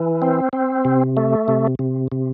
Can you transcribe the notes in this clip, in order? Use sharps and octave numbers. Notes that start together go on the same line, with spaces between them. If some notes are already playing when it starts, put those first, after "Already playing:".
Already playing: E3
C4
C4
C3
A3
C3
C3
C3